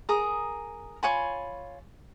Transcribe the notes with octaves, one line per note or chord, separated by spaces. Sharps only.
G#4 A#4 A#5 D#6
F4 C#5 G#5 B5